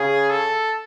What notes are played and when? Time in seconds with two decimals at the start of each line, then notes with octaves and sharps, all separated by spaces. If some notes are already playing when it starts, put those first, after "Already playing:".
Already playing: C#3 G#4
0.30 A4